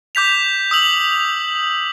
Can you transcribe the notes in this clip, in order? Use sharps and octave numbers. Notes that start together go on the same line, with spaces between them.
D6 G6 B6 F7
D#6 E6 F#7